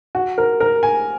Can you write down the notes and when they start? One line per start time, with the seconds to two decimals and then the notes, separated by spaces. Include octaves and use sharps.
0.15 F#4
0.38 A#4
0.60 A#4
0.83 G#5